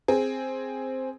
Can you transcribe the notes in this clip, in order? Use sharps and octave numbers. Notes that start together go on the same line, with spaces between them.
C4 G#4